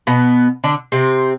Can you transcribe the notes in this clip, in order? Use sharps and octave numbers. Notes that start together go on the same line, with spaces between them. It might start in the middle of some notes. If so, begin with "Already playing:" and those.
B2 B3
D3 D4
C3 C4